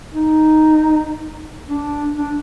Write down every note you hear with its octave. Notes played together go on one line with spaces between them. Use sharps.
D#4
D4
D4